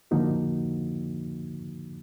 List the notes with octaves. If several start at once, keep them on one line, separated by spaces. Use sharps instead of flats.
D3 F3 A#3 D#4 F#4